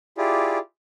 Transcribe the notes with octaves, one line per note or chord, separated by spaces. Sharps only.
E4 F4 G4 G#4 D5